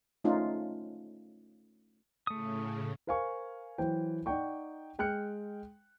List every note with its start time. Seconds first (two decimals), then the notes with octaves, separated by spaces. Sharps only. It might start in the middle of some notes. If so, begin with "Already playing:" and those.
0.24 A3 C#4 D#4 F4
2.27 A2 C#3 A3 D#6
3.07 A#4 C5 F5 G#5 C#6
3.78 E3 F#3 C5 G5
4.26 D#4 D5 F#5 G5 C#6
4.99 G#3 G5 F6 F#6 C#7